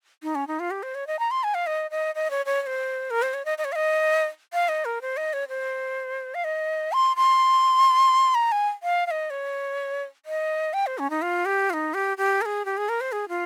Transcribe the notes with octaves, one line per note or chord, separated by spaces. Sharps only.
D#4
C#4
D#4
F4
G4
C5
C#5
D#5
A#5
C6
G#5
F5
D#5
D#5
D#5
C#5
C#5
C#5
C5
A#4
C5
C#5
D#5
D#5
C#5
F5
D#5
F5
D#5
A#4
C5
D#5
C#5
C5
F5
D#5
C6
C6
A#5
G#5
F5
F5
D#5
C#5
D#5
G5
C5
C#4
D#4
F4
G4
F4
D#4
G4
G4
A#4
G#4
G4
G#4
A#4
C5
G#4
F4